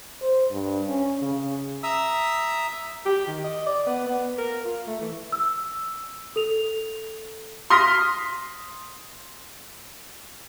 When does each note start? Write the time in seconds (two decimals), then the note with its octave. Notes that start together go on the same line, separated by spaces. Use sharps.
0.22 C5
0.51 G2
0.88 C#4
1.22 C#3
1.83 E5 A#5 D#6 E6
3.05 G4
3.27 D#3
3.44 D#5
3.66 D5
3.86 B3
4.06 B3
4.38 A#4
4.65 F4
4.87 A3
5.01 E3
5.32 E6
6.36 A4 F7
7.70 C6 D#6 F6 A#6 B6